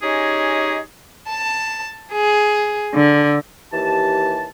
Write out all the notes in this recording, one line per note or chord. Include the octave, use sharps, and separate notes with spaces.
C#4 D#4 G4 G#4 C#5 D#5
A5
G#4
D3
D#2 E3 G4 A5